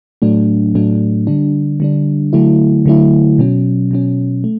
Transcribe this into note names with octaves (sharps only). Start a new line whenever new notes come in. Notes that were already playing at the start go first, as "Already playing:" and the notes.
A2 F#3 A3 D4
A2 F#3 A3 D4
D3 G3 D4
D3 G3 D4
D3 F#3 A3 E4
D3 F#3 A3 E4
B2 F#3 C#4
B2 F#3 C#4
A3